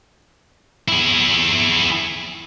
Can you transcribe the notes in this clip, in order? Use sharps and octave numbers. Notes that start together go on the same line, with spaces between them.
E4 G#4